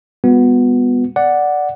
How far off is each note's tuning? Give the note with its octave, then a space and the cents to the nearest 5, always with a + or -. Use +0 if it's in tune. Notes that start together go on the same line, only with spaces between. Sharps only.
G3 +45 B3 +0 F#4 -35
D5 +0 F#5 +0